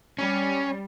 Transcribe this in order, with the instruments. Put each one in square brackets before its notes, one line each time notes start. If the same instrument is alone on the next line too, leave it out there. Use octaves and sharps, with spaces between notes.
[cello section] G3 [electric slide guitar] C#4